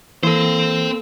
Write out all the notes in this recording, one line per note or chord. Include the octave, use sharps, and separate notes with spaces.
E3 A#3 C4 A4 C5